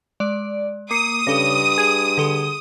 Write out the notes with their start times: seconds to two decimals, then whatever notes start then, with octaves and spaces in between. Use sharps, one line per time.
0.20 G#3 D5
0.91 A#3 D6 D#6 C7 C#7
1.27 G2 C#3 A4 D6 A#6
1.78 G#4 G#6
2.18 D3 A4 C6